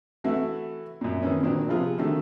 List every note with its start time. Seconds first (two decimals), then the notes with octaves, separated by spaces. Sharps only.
0.24 E3 A3 E4 F#4
1.01 F#2 A#2
1.22 D#3 E3 C#4
1.43 A#2 D#3 F#3 C4 D4
1.68 C3 F3 B3 F4 G#4
1.98 D3 D#3 F#3 A3